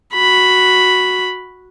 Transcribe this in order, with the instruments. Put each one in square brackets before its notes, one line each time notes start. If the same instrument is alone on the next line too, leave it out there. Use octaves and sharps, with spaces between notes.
[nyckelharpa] F#4 B5